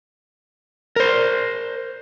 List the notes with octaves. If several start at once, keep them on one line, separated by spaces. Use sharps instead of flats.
A#4 C5